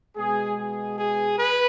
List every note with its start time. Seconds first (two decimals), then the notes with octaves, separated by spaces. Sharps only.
0.17 B2 G#3 B3 G#4
0.58 G#4
0.98 G#4
1.38 B4